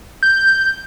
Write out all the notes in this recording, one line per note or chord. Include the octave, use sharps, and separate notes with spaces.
G6